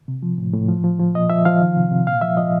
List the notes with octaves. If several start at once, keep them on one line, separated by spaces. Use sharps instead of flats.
C3
F3
A2
A2
F3
F3
F3
A#2 D#5
F3 E5
F3 F5
D#3
C3
C3
A#2 F5
F3 E5
F3 D#5